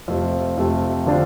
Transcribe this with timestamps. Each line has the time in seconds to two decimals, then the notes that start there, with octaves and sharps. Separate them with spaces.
0.08 F2 C3 A3 F4
0.58 F2 C3 A3 F4
1.06 D3 F3 D4 F4 C5